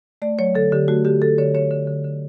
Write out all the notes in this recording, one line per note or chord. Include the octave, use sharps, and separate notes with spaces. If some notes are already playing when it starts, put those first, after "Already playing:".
A3 D5
F#3 C#5
D3 A4
D3 G4
A3 F#4
D3 G4
D3 A4
D3 C#5
D3 C#5
D3
D3
D3